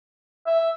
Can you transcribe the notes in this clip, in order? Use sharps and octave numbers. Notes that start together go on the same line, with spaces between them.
E5